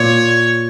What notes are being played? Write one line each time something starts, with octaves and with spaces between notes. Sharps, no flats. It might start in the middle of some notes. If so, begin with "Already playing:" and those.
Already playing: A#2 C#5